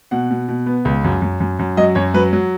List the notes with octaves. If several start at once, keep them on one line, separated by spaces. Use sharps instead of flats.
B2 F#5
B2
B2
B3
C#2
F#2
F#2
F#2
F#2
F#3 D#5
F#2 C#5
F#3 B4
F#3